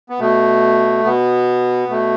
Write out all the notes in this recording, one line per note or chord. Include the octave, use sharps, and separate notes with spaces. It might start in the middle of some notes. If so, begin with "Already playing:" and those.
B3
B2 A3
B2 B3
B2 A3